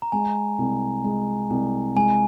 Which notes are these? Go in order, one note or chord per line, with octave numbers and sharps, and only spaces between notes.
A#5
G#3 G#5
C2
G#3
C2
G#3 G#5